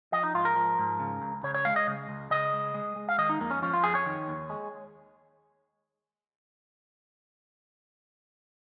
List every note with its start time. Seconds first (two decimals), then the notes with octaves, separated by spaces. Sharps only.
0.12 F3 D#5
0.24 D#4
0.34 G#2 F4
0.45 A#4
0.56 F3
0.79 G#2
1.00 C#3
1.21 C#2
1.43 C#3 C#5
1.54 C#5
1.65 G#3 F5
1.76 D#5
1.87 C#3
2.09 C#2
2.30 C#3 D#5
2.53 G#3
2.74 G#3
2.96 G#3
3.09 F5
3.18 D#3 D#5
3.29 D#4
3.40 F2 A#3
3.51 C#4
3.62 F3 C#4
3.73 F4
3.84 F2 G#4
3.95 C#5
4.06 D#3
4.28 D#2
4.50 G#3